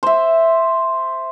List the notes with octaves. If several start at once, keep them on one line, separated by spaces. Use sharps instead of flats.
C5 E5